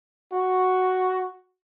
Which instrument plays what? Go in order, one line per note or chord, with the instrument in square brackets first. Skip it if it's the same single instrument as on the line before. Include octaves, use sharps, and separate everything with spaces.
[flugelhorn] F#4